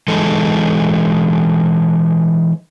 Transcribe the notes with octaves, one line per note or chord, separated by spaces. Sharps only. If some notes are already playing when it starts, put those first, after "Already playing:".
E3 G#3 D#4 A4